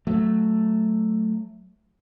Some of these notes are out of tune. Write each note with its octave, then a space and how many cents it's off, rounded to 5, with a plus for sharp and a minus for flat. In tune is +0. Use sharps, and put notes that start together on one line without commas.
F#3 +0 A3 +0